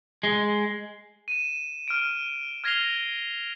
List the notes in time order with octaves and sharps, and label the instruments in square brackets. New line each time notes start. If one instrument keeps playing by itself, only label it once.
[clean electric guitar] G#3
[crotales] D#7 E7
F6 D7
F6 G#6 A#6 C7 F7 G7